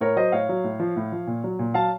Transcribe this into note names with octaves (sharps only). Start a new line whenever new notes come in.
A2 A#4 C#5
F#3 C5 D#5
A2 C#5 F5
F#3
A2
F3
A2
F3
A#2
F#3
A#2
F#3 F5 A5